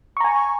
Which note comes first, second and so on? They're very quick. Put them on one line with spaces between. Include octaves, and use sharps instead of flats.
C#6 A#5 G#5